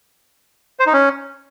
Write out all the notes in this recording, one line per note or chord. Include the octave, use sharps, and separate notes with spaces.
C5
D#4
C#4